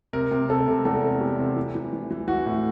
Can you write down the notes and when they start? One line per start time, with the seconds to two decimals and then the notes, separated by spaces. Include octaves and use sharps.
0.13 C3 A#4
0.31 C3
0.49 C3 A4
0.68 C3
0.85 E2 A4
1.03 C3
1.20 E2 G4
1.39 C3
1.56 E3
1.75 E3
1.93 E3
2.11 E3
2.28 E3 F#4
2.46 A2